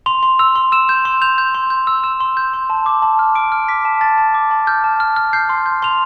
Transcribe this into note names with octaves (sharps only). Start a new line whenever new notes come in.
C6 F7
C6
E6 F7
C6
E6 E7
G6 E7
C6
G6 F7
G6
C6
G6
E6
E6 E7
C6
G6
C6
A5
D6
A5
F6
D6 D7
F6
D6 B6
A5
A5 A6
A5
D6
A5
F6 G6
A5
F6
F6
G6 C7
C6
G6
C6 F7